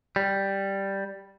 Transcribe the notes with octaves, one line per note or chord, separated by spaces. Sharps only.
G3